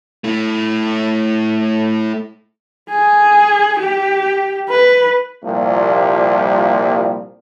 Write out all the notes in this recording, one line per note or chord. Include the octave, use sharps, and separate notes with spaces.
A3 E4
G#4
G4
B4
C2 A#2 F3 G3 A#3